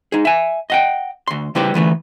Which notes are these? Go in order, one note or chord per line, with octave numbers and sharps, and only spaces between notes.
D#4 G#4
E5 G#5
D#5 F#5 G5
D2 C6
C#3 G3 E4 G4 B4 C5
D2 E3 A3 B4